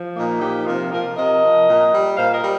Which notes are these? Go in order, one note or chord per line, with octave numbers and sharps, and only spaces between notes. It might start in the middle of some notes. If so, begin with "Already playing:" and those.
Already playing: F3
A#2 A#3 D#4
F3 D#4 G4
C3 F4 A#4
F3 F4 A#4
C3 A#4 D#5
F3
A#2
G3
A#2 C5 F5
A#4 D#5
G3